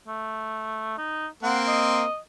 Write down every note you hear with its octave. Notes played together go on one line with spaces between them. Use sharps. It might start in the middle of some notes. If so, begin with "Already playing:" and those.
A3
D#4
A#3 C4 F#5
D#5